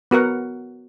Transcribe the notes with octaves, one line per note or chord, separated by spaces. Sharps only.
B3 F#4 A#4 F#5